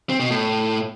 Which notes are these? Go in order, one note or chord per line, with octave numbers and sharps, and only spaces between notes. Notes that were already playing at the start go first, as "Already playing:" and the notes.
C4
B2
A2